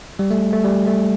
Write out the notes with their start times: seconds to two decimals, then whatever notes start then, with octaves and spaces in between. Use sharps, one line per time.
0.19 G3
0.31 A3
0.53 A3
0.64 G3
0.87 A3